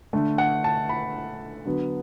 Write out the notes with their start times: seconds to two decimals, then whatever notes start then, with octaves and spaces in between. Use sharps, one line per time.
0.13 D3 A3
0.38 F#5
0.64 A5
0.89 B5
1.65 D3 F#3 B3